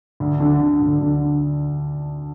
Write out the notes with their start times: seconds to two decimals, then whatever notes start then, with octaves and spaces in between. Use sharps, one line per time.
0.20 D2
0.40 D3
0.61 D3
0.81 D2
1.02 D3